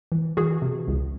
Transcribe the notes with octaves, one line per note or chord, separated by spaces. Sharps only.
E3
E3 F#4 G#4
C3
C#2